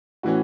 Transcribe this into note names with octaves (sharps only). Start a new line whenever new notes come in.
A2 E3 C#4 F#4